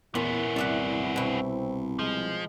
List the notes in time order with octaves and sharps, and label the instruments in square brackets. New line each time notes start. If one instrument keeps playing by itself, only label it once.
[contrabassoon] E2 [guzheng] A#2 [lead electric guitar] B3 C#4 [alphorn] E4
[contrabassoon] C2 [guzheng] D5 E5 F#5
[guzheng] B2 E4 [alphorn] C4
[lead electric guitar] F3 [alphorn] G#3